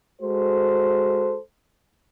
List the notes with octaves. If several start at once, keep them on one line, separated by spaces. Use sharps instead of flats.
G#3 F#4 A4 C5